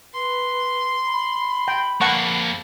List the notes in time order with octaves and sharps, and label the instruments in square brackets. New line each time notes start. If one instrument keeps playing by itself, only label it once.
[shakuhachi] B4 [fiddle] C6
[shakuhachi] B5
[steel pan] G5
[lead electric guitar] F2 A#3 [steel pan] F#5 A5 C#6